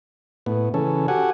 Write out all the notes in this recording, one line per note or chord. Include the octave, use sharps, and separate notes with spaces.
A2 B3
C#3 E3 C#4 A4
F#4 G4 A4 F#5 G#5